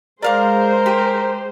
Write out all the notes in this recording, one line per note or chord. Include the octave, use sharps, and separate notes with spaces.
G#3 G#4 A#4 C5 D5 F5 D6
G4